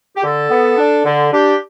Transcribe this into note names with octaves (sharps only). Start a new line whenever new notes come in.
G4
D3 A4
B3
D4
D3
D4 G4